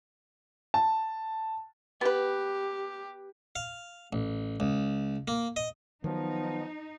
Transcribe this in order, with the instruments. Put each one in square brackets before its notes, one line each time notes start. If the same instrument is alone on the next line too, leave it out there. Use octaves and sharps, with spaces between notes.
[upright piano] A5
[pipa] B3 B4 [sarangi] G4
[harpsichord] F5
A1
C#2
A#3
D#5
[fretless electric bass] D#3 F#3 [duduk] F3 [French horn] B3 [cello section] D#4